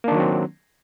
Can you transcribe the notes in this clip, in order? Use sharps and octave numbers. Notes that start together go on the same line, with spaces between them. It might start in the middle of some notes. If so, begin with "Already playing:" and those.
D#3 F#3 A#3 C4 D4